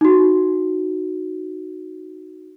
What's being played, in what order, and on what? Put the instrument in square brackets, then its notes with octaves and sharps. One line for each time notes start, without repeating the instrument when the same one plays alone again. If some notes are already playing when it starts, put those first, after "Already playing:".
[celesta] D#4 F#4